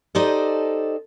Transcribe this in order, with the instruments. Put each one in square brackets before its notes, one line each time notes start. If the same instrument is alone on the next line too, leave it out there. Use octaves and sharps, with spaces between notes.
[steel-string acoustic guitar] D#4 G4 A4 C5 D5 D#5